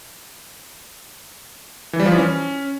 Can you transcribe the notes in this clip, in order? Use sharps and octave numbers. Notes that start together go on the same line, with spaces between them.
E3
G3
F3
E3
C#4